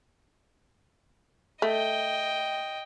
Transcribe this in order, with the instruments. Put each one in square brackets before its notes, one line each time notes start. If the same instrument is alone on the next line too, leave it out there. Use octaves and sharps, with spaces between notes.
[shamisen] A3 [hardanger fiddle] D#5 G5